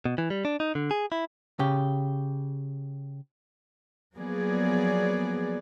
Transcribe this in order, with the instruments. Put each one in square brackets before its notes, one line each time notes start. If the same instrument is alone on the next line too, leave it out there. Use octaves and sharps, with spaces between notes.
[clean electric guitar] B2
E3
G3
D4
D#4
D3
G#4
E4
[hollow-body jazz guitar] C#3 G4
[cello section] F3 F#3 A#3 B3 G#4 D5